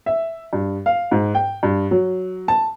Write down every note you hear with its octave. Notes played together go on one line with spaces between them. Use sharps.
E5
G2
F5
G#2
G5
G2
F#3
A5